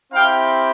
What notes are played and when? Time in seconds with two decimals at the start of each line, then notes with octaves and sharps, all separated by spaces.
0.12 C4 E4 G4 F5 G5